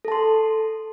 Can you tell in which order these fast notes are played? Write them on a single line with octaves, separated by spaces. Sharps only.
A4 A5 C6